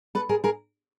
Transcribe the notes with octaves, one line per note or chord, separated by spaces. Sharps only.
A4 B4
G#4 A#4
G#4 A#4